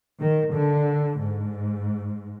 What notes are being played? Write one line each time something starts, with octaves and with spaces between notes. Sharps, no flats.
D#3
D3
G#2